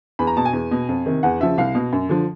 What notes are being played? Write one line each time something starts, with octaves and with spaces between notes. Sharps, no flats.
E2 B5
A#5
B2 A5
G#5
E2
B2
F2
C3 D#3
E2 F#5
C#3 F3 E5
C2 F5
B2
F#2
D3 F3